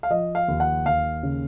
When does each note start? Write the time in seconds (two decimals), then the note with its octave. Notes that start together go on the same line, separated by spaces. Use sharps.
0.03 F5
0.10 F3 D#5
0.35 F5
0.48 D#2
0.60 F#5
0.86 D#2 F5
1.23 C#3